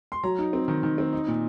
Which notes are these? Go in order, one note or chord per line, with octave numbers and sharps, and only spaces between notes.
C6
F#3 A#5
D#4
C4
D#3
D#3
C4
D#4
A#2